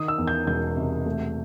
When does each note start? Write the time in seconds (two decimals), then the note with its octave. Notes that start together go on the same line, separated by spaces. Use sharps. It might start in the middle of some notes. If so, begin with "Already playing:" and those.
Already playing: D#3 D#6
0.08 E6
0.18 E2
0.27 G6
0.47 E1 G6
0.77 C3
1.06 A3